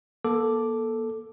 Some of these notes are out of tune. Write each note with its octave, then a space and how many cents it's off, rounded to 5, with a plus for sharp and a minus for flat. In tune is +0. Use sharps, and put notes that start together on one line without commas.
A#3 +40 A4 +0 D6 +0